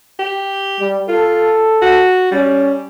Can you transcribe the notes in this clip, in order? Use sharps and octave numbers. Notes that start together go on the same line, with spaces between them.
G4
G3
F4 A4
F#4
G3 C#4